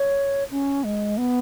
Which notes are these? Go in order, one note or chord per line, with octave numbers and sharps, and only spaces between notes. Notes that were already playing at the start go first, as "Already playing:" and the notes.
Already playing: C#5
C#4
G#3
B3